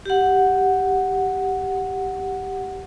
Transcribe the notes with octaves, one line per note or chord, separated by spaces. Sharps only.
G4 F#5